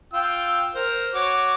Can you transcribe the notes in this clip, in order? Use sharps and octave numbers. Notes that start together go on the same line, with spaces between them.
F4 G5 E6
A#4 C5
F#4 C#5 D6